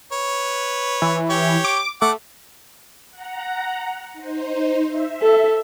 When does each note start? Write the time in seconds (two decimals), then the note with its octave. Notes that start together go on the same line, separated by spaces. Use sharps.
0.12 B4 C#5
1.02 E3
1.30 G4 C#5
1.64 D6
2.02 A3 F#5 D6
3.11 F#5 A#5
4.13 D#4 C5
4.85 E5
5.22 A4